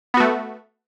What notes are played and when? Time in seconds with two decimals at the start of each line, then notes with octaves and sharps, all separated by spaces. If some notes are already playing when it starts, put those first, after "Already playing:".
0.14 B3
0.17 F#4
0.20 A3